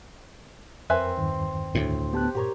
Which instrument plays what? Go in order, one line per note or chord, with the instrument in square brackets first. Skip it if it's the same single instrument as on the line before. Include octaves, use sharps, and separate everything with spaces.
[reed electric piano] F2 A#4 [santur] C4 [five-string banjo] B4 E5 G#5
[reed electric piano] E2 G2 D#3
[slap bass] D2 A2
[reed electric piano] B3 A5 F#6 [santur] G4
[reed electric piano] G2 A#2 [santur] G4 A#4 C#5